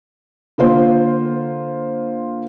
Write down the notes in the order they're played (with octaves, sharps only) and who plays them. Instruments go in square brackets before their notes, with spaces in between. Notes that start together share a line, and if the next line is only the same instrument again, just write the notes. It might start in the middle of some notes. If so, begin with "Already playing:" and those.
[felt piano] D3 A#3 F4 C5